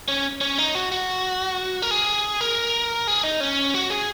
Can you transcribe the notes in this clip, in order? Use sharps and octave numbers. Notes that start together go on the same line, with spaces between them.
C#4
C#4
D#4
F#4
F#4
A#4
G#4
A#4
G#4
D#4
C#4
F#4
G#4